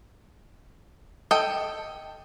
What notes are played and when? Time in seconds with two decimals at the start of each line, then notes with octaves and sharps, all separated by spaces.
1.31 A4 D#5 G5